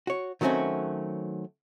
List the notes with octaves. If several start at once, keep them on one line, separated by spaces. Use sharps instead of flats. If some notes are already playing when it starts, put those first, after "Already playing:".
F#4 C#5
D#3 F#3 A3 C4 C#4 F#4